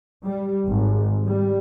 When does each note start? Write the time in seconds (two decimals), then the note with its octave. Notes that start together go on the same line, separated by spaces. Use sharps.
0.25 G3
0.67 G#1
1.26 G3